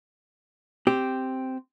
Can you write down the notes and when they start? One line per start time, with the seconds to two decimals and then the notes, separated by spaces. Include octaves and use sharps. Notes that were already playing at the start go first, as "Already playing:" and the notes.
0.87 C4 G4